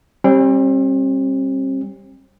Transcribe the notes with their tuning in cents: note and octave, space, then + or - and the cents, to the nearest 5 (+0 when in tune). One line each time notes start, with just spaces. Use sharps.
G3 +0 C4 +40